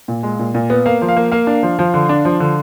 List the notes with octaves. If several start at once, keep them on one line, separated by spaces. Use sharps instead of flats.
A#2
G#3
A#2
A#2
B3
A#3 F5
F3
F5
A#3
A#3 F5
D4
F3
F3
D3
D4
F3
D3